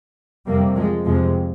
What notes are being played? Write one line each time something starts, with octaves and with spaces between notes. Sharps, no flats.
F2 C3 G3 A#3
F3 G#3
F2 C3 F3 G#3